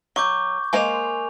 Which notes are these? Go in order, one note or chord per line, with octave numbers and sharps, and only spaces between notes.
F#3 C#6 D6 G6
G#3 A#3 C5 G#5 F7